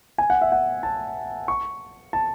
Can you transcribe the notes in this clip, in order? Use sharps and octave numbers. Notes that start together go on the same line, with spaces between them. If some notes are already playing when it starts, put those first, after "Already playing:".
G#5
F#5
E5
F#5
A5
C#6
A5